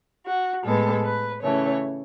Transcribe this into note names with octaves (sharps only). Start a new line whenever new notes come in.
F#4
A2 G#3 B3 A4
B4
C#3 E3 A3 C#5